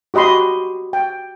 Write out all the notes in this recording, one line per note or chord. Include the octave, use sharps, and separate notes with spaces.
F#4 G4 D#5 B5 C6
G5